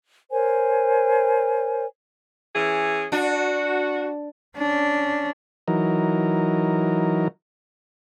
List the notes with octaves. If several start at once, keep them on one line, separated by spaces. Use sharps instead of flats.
A#4 C5 C#5 G#5
E3 C#4 G#4
D4 F#4
C#4 D4
E3 F#3 D#4 A#4